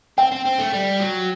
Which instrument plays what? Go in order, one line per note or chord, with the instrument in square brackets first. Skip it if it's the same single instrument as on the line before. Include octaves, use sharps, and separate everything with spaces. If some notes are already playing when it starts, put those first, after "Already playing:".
[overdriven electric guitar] C4 [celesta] G5
[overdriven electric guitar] C4
C4
A3
G3
F#3